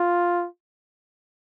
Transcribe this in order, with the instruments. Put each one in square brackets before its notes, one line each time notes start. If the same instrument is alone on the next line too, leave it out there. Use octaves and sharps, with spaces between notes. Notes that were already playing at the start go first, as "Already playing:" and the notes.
Already playing: [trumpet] F4